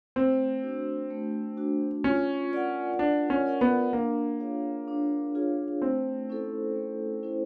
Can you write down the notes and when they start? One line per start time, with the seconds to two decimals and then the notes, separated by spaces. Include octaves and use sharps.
0.16 A3 C4
0.63 D4 F#4
1.10 A3
1.57 D4 F#4
2.04 C#4 F4
2.51 A#4 D5 F#5
2.98 D4 F4
3.30 C#4
3.46 A#4 D5 F#5
3.61 B3
3.93 A#3 D4
4.40 F4 G#4 C#5 F5
4.88 D4
5.35 F4 G#4 C#5 F5
5.82 A3 C4
6.29 C#4 E4 A4 C5
6.76 A3
7.23 C#4 E4 A4 C5